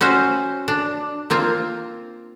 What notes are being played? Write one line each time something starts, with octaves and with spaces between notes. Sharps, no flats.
C4 C#4 F#4 C5
D4
A#3 C4 F4